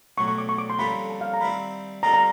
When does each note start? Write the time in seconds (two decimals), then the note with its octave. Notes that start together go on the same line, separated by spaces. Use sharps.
0.18 B1 A2 F#3 C#6
0.28 C#6
0.38 D6
0.49 C#6
0.58 D6
0.70 C6
0.79 F2 D3 G3 A#3 C#4 B5
1.10 A5
1.21 F5
1.34 A#5
1.41 D#3 G3 C4 E4 B5
2.03 D3 G3 C4 F4 A4 A#5
2.14 A#5